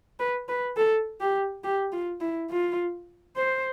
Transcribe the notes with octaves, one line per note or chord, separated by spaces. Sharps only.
B4
B4
A4
G4
G4
F4
E4
F4
C5